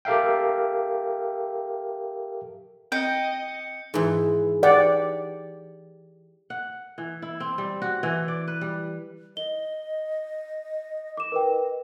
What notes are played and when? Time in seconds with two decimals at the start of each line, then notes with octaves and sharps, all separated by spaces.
0.05 G4 A4 A#4 E5 F5 G5
2.92 C4 D#5 G5 G6 C#7
3.94 G#2 E3
4.63 G4 D5 F#5
6.50 F#5
6.98 E3
7.22 E4
7.40 C4
7.58 G3
7.82 F#4
8.03 E3
8.28 D5
8.48 B4
8.61 G3
9.37 D#5 G7
11.17 D6 E7
11.32 A#4 B4 G5